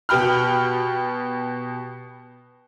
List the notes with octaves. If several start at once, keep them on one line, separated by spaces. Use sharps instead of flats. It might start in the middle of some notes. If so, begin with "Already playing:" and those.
B2 B3 G4 G5 B5 F6